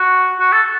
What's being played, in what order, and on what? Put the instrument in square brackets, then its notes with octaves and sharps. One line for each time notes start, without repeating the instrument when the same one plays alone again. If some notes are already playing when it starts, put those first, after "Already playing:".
Already playing: [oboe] F#4
F#4
A4